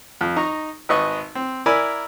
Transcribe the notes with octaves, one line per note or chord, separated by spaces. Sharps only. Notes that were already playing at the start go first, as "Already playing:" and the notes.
F2
D#4 A#5 C#6
G#1 B4 D#5 C#6
C4
E4 A#4 D5 G#5 B5 E6